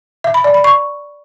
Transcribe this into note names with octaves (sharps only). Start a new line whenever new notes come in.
E5
B5
D5
B5
C#6